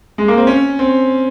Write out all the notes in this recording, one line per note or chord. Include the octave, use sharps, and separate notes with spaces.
G#3
A#3
C4
C#4
C4